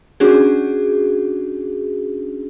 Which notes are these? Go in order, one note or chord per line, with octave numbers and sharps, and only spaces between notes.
C#4 D4 F#4 G#4